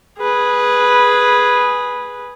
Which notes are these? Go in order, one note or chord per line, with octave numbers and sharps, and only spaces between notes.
G#4 B4